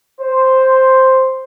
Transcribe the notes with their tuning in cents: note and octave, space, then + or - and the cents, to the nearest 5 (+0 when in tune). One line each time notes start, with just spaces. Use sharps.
C5 +0